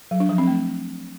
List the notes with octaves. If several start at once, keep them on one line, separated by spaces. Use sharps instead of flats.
F#3
D4
F3
C4
A3